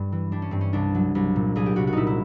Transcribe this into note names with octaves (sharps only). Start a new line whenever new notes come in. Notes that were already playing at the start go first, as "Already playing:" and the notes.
Already playing: G2 G3 D4
E3
G3 D4
C#4
G2 C4
C#4
C2 D4
F#3
C2
A#2
C2 G#4
G4
C2 F#4
F#4
A#2 D#4 E4
E4